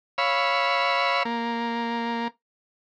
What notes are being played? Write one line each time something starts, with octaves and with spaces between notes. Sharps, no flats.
C#5 F5 B5 E6
A#3